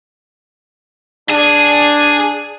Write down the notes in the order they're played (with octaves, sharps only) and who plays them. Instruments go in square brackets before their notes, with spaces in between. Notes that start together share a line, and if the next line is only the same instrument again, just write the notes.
[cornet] D4 [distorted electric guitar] G#4